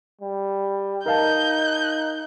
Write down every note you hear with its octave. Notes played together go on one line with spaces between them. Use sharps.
G3
D#4 A#4 F5 A5 G6